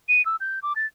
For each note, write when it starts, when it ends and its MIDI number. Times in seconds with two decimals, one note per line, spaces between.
0.09 0.24 99
0.26 0.36 88
0.41 0.59 91
0.63 0.73 86
0.76 0.86 93